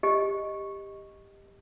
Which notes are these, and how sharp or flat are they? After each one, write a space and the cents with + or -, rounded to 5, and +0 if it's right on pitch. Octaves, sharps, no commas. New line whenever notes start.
G4 +15 D#5 +0